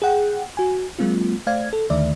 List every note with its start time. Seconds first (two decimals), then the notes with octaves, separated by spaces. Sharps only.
0.02 G#4 F#5 G5
0.57 F#4 G#5
0.99 F#3 G#3 A#3 C4 F4
1.47 A3 C5 D5 F5 G#6
1.73 A4
1.90 D#2 D3 D#3 A3 D5 E5